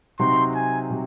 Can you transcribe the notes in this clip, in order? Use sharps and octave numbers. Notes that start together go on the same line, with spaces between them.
C3 F#3 C4 D#4 F#4 C6
G#5
C3 F#3